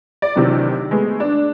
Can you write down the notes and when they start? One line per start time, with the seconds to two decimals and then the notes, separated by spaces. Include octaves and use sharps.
0.22 D5
0.36 C3 D#3 E3 F#3 D4
0.91 G#3 A3 B3
1.20 D4